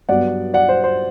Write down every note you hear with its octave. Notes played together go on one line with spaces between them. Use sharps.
G2 F#3 B3 D5 F#5
D5 F#5
C5
C5